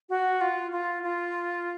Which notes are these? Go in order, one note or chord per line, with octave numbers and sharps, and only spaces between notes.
F#4
F4
F4
F4